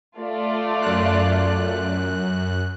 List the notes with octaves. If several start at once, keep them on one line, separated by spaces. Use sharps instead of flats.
A3 F4 D5
F#2 F#6